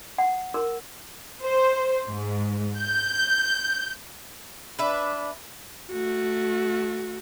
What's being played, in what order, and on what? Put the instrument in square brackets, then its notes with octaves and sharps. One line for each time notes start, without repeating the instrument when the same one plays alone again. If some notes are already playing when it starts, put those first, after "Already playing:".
[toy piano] F#5
A#4
[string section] C5
G#2
G6
[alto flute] D4 [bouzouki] B4 E5
[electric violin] A3 F#4